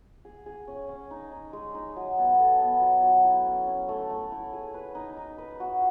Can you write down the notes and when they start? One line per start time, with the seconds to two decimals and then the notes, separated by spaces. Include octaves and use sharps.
0.25 G#4
0.46 G#4
0.68 C#4
0.89 C#4
1.11 D#4
1.32 D#4
1.53 G#3
1.75 D#4
1.96 F#3
2.18 B3
2.39 A4
2.60 B3
2.81 F#3
3.03 F#3
3.24 E4
3.46 C#4
3.67 C#4
3.89 A3
4.10 A3
4.32 E4
4.53 G#4
4.74 B4
4.95 D#4
5.17 D#4
5.38 B4
5.60 F#4